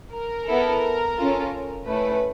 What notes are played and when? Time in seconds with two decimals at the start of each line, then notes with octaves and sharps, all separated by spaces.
0.12 A#4
0.47 B3 E4 A4
1.18 C#4 F4 A4
1.87 A3 C#4 E4 B4